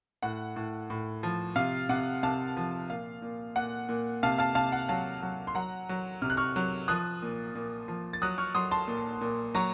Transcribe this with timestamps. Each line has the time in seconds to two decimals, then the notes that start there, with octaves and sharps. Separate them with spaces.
0.23 A2 F#5
0.56 A2
0.90 A2
1.23 F3
1.56 C3 F5
1.89 C3 F#5
2.23 C3 F5 A5
2.57 F3
2.90 A#2 F5
3.22 A#2
3.56 A#2 F#5
3.89 A#2
4.23 C3 F5 A5
4.38 F5 A5
4.55 C3 F5 A5
4.72 F#5
4.89 F#3 F5 A5
5.22 F#3
5.47 C6
5.55 F#3 F#5 A#5
5.89 F#3
6.22 C3 F6
6.30 F#6
6.37 C#6 F6
6.56 F#3
6.88 F3 D#6 F#6
7.22 A#2
7.55 A#2
7.88 F3
8.13 A6
8.22 F#3 D#6 F#6
8.38 C#6 F6
8.55 F#3 C6 D#6
8.71 A5 C6
8.88 A#2
9.21 A#2
9.54 F#3 A#5 C#6